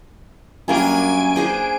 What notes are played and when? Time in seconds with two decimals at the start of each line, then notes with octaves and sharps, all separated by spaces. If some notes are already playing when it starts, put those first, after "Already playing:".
0.68 F#2 G3 A#3 D4 G#5 D7
1.36 D4 G#4 C5